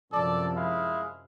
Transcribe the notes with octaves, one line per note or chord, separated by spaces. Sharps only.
F#2 C3 F3 A4 D5
G#3 E4 F5